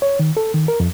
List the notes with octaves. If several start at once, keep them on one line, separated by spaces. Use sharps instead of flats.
C#5
D#3
A4
D#3
A#4
F2